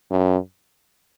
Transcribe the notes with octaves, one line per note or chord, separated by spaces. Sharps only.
F#2